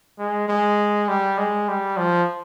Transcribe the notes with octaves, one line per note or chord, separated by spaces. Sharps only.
G#3
G#3
G3
G#3
G3
F3